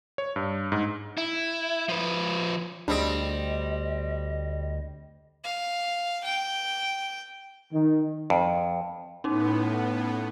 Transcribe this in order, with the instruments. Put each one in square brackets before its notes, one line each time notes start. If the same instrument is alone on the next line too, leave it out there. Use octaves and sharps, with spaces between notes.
[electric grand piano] C#5
G2
G#2
[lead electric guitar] E4
F3 B4
[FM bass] D2 [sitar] G3 C4 [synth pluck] D4 G#4 [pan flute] D#5
[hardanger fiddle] F5
G5
[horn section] D#3
[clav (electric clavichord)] F2
[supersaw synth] A2 B3 [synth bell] C#4 D#4